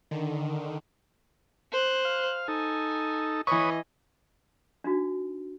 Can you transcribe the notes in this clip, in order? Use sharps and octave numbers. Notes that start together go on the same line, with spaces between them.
D3 D#3
C5 F#6
F5
D#4 A4 G#5
E3 B4 C#5 D#5 C#6 D#6
D4 D#4 F#4